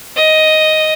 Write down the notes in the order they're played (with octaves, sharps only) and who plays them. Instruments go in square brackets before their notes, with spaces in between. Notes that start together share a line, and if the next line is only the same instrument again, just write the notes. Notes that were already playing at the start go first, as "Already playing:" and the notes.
[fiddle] D#5